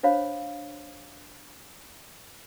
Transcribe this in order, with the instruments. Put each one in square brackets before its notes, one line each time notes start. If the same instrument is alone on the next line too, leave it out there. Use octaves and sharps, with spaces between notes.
[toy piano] D4 C5 C#5 F5 B5